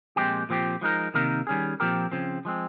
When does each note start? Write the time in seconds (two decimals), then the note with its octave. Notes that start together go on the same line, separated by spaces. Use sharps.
0.16 A#2 F3 G#3 C4 G4
0.49 A#2 F3 C4 G4
0.81 F3 G#3 D#4 A#4
1.14 C3 D#3 A#3 D#4 A#4
1.47 D#3 G3 C#4 G#4
1.80 A#2 F3 C4 G4 A#4
2.12 C#3 F3 C4
2.45 F3 G#3 C4